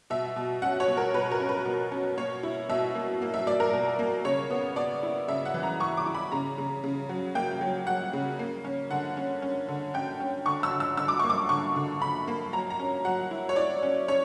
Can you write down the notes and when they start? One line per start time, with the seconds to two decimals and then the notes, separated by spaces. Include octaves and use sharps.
0.10 B2 E5
0.36 B2
0.62 C#4 F#5
0.80 C#5
0.88 B2
0.97 A#4
1.14 B2 B4
1.31 A#4
1.40 C#4
1.49 B4
1.65 B2
1.92 C#4
2.17 A#3 C#5
2.43 E4
2.69 B2 E5
2.95 A#3
3.22 A#3
3.34 E5
3.47 A#3 D5
3.60 A#4
3.73 B2
3.99 A#3
4.24 C#3 C#5
4.50 B3
4.76 B3 D5
5.03 E4
5.28 C#3 E5
5.46 F#5
5.54 E3
5.63 A#5
5.80 E3 C#6
5.97 D6
6.06 E4
6.15 B5
6.32 C#3 A#5
6.58 C#3
6.84 C#3
7.09 F#3
7.35 A#3 G5
7.61 F#3
7.87 F#3 F#5
8.13 C#3
8.39 A#3
8.64 C#4
8.91 D3 F#5
9.17 C#4
9.42 C#4
9.68 D3
9.94 C#4 G5
10.20 C#4
10.46 D3 C#6
10.63 E6
10.72 D3
10.80 E6
10.97 D3 E6
11.08 D6
11.19 A#3 C#6
11.30 D6
11.49 D3 C#6
11.76 D3
12.01 D3 B5
12.28 A#3
12.53 F#3 A#5
12.70 A#5
12.79 C#4
13.05 F#3 F#5
13.31 E4
13.49 C#5
13.56 E4 D5
13.83 C#4
14.08 C#4 C#5